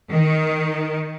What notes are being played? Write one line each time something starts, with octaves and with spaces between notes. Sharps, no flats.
D#3